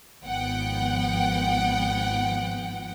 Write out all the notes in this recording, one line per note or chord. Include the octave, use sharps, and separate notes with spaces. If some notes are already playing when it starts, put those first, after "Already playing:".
G#1 F3 B3 F#5 G5